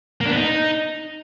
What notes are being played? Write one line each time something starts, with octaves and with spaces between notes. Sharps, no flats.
A#3
D4
B3
D#4